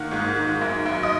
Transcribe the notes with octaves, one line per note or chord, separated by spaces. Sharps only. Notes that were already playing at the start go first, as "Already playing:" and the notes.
Already playing: D#3 A#3 F#5
G#2
D#3
F#2
F#2
D#5